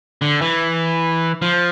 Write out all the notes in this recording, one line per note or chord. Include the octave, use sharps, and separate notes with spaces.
D3
E3
F3